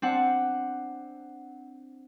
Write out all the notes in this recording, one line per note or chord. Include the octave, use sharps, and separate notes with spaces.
C4 D4 F#5